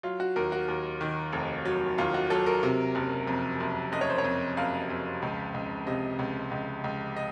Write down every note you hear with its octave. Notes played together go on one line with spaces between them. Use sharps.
F#3 F4
F#4
D#2 A#4
F#4
D#2
D#3
F1
F#3
D#2 F4
F#4
F#3 A4
A#4
C3
F#1
F2
F#1
F#1 D#5
C#5
C5
C#5
F2
F#1 F5
F2
C#2
C#2
C3 D#5
C#2
C#2
C#2
D#5